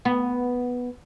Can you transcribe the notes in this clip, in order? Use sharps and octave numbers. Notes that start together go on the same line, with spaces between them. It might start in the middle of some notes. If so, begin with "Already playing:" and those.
B3